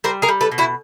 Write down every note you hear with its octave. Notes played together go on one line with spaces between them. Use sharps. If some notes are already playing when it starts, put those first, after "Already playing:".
G3 A#4 C5
G#4 A#4
G3
A4 B4
B2
E4 F#4